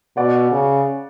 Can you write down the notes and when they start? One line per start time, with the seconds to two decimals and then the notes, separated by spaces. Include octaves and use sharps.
0.17 B2 D5 F#5
0.51 C#3